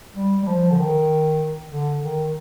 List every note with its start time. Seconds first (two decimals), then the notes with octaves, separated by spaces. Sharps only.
0.16 G3
0.43 G3
0.47 F3
0.71 D3
0.78 D#3
1.70 D3
2.01 D#3